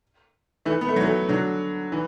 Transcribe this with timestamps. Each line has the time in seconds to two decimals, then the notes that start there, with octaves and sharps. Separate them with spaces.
0.65 E3 A3
0.81 B3
0.88 A3
0.96 F#3
1.03 E3 A3
1.29 D3 F#3
1.92 E3